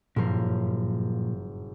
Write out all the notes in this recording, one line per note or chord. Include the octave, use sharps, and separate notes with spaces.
F#1 G2 A#2 F3 A#4